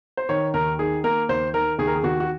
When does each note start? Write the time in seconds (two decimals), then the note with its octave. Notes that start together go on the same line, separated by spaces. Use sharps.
0.17 C5
0.29 D#3 C#5
0.54 D#2 A#4
0.79 D#3 G#4
1.04 A#3 A#4
1.29 D#2 C5
1.54 D#3 A#4
1.78 D#2 G#4
1.87 A#4
1.96 G#4
2.03 D#2 F#4
2.20 F#4